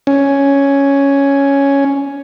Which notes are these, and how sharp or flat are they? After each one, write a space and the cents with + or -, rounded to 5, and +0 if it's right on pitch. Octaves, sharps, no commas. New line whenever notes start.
C#4 +5